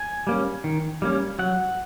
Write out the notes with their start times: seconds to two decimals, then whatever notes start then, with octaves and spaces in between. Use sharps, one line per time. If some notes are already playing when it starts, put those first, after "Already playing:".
Already playing: G#5
0.27 G3 A#3 C#4
0.64 D#3
1.02 G3 A#3 C#4
1.39 F#3 F#5